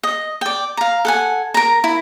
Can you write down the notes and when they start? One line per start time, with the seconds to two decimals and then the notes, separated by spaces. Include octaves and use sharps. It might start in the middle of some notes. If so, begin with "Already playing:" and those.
0.03 D#5
0.41 D5 G5
0.77 F5 A#5
1.05 A4 F#5 G#5
1.54 A#4 A#5
1.84 E4